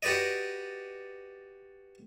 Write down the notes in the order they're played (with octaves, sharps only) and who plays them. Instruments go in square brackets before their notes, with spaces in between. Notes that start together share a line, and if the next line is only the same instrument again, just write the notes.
[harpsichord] F#4 G4 B4 D5 D#5